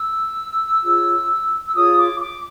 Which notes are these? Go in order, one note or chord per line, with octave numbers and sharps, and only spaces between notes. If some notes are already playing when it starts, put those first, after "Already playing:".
Already playing: E6
F4 G#4 C#5
E6
F4 G#4 C#5 D#6
D6
D6